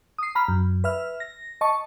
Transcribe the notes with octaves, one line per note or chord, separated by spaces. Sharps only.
D#6 C7
A#5 B5 F6
F#2
B4 E5 F6
A#6
D#5 A5 C#6